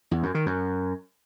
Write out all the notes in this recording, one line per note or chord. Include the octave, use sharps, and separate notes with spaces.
E2
F#2
D#3
F#2